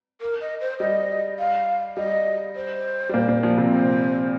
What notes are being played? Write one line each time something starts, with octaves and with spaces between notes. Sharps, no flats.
A#4
D#5
C5
G3 D#5
F5
G3 D#5
C5
G3
A#2 A#3
A#2 A#3
F3
C3 C4
C5